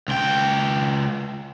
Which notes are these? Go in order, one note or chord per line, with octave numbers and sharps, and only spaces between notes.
C#2 G5